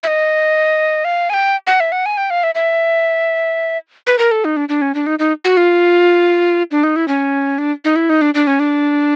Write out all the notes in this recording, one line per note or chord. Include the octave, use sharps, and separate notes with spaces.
E5
D#5
F5
G#5
G5
F#5
E5
F#5
G#5
G5
F5
E5
E5
B4
A#4
A4
D#4
D4
D4
C#4
D4
D#4
D#4
F#4
F4
D4
D#4
E4
C#4
D4
D#4
E4
D#4
D4
D4
C#4
D4